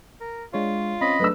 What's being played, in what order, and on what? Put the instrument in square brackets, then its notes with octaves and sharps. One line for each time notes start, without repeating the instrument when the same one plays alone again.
[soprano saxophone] A#4
[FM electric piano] G#3 D4 C#5 [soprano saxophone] F4
[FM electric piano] C4 C#4 [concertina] D#5 B5
[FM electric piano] F#3 A3 D4 [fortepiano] B4 E6